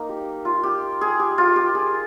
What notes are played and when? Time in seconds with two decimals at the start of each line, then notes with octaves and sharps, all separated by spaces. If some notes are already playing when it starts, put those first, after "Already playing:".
Already playing: A#3 D#4
0.09 G4
0.45 F4
0.63 G4
1.01 G#4
1.19 G4
1.38 F4
1.56 G4
1.75 G#4